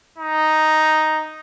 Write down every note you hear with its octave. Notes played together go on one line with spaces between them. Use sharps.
D#4